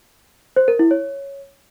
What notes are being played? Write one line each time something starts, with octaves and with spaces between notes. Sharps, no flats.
C5
A#4
E4
C#5